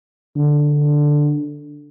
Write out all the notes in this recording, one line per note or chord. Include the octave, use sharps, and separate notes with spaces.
D3